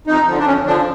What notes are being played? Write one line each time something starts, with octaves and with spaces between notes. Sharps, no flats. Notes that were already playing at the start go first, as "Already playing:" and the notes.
F2 D#4
D3 F3
D4
F2 C#4
D3 F3 D4